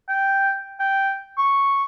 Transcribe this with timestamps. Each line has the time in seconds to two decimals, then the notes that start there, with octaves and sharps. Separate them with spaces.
0.09 G5
0.80 G5
1.38 C#6